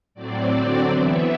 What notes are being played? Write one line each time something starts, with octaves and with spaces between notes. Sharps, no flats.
A2 F#3 C4 D5
D3 F#3 C4
E3 B3 E5